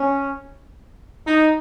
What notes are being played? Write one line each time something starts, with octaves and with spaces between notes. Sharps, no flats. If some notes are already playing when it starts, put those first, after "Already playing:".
Already playing: C#4
D#4